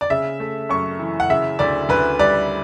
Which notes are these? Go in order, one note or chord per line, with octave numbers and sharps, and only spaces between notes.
D5
C#3 E5
A3
F#2 C#6
E3
F#5
C#3 E5
D2 D5
D2 B4
G3 D5